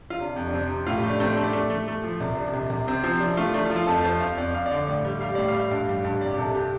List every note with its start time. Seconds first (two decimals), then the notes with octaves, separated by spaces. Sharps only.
0.10 F4
0.19 C3 D4
0.36 F2
0.48 D4
0.54 C3 C4
0.70 C3
0.86 A2 F4
0.98 G4
1.03 A3
1.10 D4
1.20 A3 C4
1.31 D4
1.37 A3
1.43 D5
1.53 A3
1.70 A3
1.88 A3
2.04 F3
2.21 C2 D5
2.37 C3 D4
2.54 C2
2.70 C2
2.87 C3 C4
3.03 F3 C4
3.20 F3 D4
3.37 A3 F4
3.54 A3 D4
3.65 F4
3.70 F3
3.76 F4
3.87 F2 A4
4.04 F3 C5
4.20 F2 F5
4.38 F2 D5
4.55 F2 F5
4.66 D5
4.71 D3
4.87 A2 D5
5.05 G3
5.21 G3 F5
5.35 A2 D5
5.48 F5
5.55 G3
5.71 G2
5.89 G3
6.04 G2
6.21 C3 D5
6.34 G4
6.38 C2 A4
6.55 G4